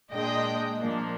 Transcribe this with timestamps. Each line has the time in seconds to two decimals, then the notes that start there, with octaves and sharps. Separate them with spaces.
0.13 A#2 G#3 D4 D#5 G5
0.78 A#2 F3 A#3 D4